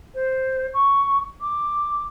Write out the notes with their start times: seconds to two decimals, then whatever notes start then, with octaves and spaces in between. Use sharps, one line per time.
0.15 C5
0.74 C#6
1.41 D6